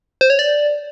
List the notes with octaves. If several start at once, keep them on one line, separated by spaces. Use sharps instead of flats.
C5
C#5
D5